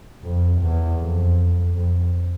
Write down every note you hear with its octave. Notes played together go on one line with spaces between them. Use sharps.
F2
E2
F2
F2